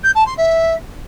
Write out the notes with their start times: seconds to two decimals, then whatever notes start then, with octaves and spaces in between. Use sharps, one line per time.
0.03 G6
0.15 A5
0.26 C6
0.37 E5